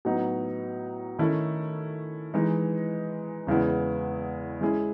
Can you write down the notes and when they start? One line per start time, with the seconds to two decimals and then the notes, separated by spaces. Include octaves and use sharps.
0.05 A2 F#3 B3 D#4 F#4
1.19 D#3 A3 C#4 E4 A4
2.34 E3 G#3 D#4
3.47 E2 C#3 G#3 B3 E4
4.61 G#3 C#4 E4 G#4